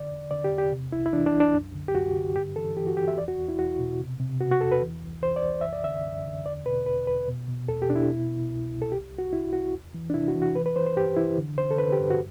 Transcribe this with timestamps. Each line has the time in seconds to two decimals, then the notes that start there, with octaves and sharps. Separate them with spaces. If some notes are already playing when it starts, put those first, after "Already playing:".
Already playing: D3 D5
0.11 E2
0.31 D3 D5
0.44 G4
0.51 E2
0.58 G4
0.72 C3
0.92 C2 E4
1.06 E4
1.13 E3 D4
1.26 D4
1.33 C2
1.40 D4
1.54 F#2
1.74 D3
1.88 G4
1.94 F#2 F#4
2.15 D3
2.36 G2 G4
2.56 E3 A4
2.76 E3 G4
2.87 F#4
2.97 E3 G4
3.08 E5
3.18 E2 D5
3.28 F#4
3.38 E2
3.48 E4
3.59 E2 F#4
3.79 B2
4.00 C3
4.20 C3
4.40 C3 F#4
4.51 F#4
4.61 E2 A4
4.72 B4
4.81 E3
5.02 C2
5.22 E3 C5
5.36 D5
5.43 C2
5.61 F#2 E5
5.73 D5
5.84 D3 E5
6.05 F#2
6.25 D3
6.45 E2 D5
6.66 B2 B4
6.86 E2 B4
7.07 E2 B4
7.28 B2
7.48 B2
7.68 E2 A4
7.82 G4
7.89 B2 D4
7.95 E4
8.10 B2
8.30 B2
8.51 C2
8.71 C2
8.82 A4
8.91 C2 G4
9.12 C2
9.18 F#4
9.33 C2 E4
9.53 C2 F#4
9.73 E2
9.94 E3
10.10 D4
10.14 C3 E4
10.28 F#4
10.35 E3
10.42 F#4
10.55 E3 B4
10.66 B4
10.76 E3 C5
10.86 C5
10.97 G2 G4
11.17 E3 E4
11.38 D3
11.58 D3 C5
11.71 A4
11.78 D3 B4
11.92 G4
11.99 G2
12.11 F#4